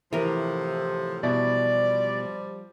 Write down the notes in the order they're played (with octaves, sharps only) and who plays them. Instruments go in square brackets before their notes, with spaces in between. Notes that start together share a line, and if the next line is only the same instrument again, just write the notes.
[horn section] A2 C3 F3 [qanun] E3 A#4
[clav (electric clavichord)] B2 E4 [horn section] F3 G3 [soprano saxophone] D5